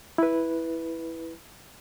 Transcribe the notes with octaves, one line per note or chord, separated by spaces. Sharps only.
E4 B4